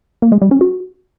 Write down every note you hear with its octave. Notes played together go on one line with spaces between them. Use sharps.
A#3
G#3
G3
C#4
F#4